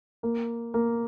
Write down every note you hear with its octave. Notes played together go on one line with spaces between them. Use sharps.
A#3
A#3